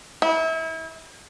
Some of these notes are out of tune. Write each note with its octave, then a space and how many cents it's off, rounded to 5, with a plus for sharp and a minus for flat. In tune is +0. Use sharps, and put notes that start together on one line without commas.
E4 -30